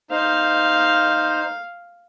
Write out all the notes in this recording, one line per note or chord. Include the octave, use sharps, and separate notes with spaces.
D#4 C5 F5